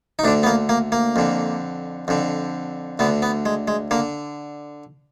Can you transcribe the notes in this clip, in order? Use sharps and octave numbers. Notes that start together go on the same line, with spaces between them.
D#4
D2 D3 D4
B3
A#3
A#3
A#3
F2 D3
F2 D3
D2 D3 B3
B3
G#3
G#3
D3 A#3